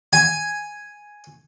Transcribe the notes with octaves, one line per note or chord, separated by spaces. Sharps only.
G#5